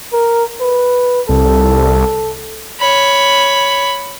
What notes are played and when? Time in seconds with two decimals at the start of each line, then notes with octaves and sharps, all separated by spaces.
0.13 A#4
0.61 B4
1.29 C2 A4
2.80 C#5 B5